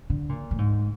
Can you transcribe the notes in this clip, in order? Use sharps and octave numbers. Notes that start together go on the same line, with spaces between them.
D3
A#2
A2
G#2